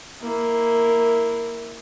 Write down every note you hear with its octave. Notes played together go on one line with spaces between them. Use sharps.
A#3 E4